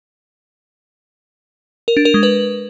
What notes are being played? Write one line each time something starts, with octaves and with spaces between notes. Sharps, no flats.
A#4
D4
A#4
G#3
B4